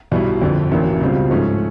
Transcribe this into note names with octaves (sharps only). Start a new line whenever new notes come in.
B1 B2 G3 B3 E4
G1 F2 D3
A1 A2 F#3 A#3 D4
C#2 B2 G3 C4 F4
G#2 F3 A3 C#4